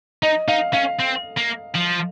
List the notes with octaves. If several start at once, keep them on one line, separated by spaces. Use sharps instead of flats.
D#4 D#5
D#4 F5
C#4 F5
C4
A#3
F3